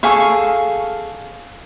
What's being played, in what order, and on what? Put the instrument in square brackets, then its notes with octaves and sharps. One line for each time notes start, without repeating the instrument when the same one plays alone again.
[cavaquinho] G#4 A4 F5 C#6